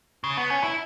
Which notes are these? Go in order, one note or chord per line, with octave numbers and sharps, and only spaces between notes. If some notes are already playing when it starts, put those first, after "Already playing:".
C#3
B3
C#4
E4